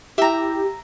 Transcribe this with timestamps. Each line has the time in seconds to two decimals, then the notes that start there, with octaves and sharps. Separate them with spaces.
0.18 E4 G4 E5 A#5